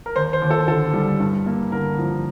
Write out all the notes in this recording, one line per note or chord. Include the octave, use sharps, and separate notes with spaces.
A#4
D#2 C5
C5
D#2
A4
D3 A4
G3
G2
A#3
D3 A#4
F3